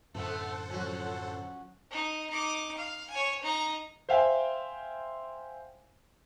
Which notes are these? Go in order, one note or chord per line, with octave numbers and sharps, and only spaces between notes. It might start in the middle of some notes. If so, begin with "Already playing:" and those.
F#2 A2 D3 A3 B3 A4 C5 F#5
F3 F#3 C#4 F#4
D#4
D#4 D6
F5
C#5 G#5
D#4 A#5
C5 E5 F5 G5 G#5